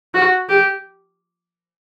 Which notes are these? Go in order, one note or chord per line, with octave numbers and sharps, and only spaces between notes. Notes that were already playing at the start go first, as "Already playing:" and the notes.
F#4
G4